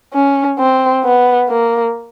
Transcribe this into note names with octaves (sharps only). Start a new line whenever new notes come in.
C#4
C4
B3
A#3